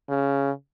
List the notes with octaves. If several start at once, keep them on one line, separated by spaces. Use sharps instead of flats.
C#3